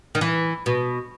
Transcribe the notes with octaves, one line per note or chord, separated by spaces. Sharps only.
D#3
E3
B2